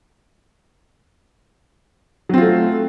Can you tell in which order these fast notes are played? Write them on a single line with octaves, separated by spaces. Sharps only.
F#3 C4 F4 A3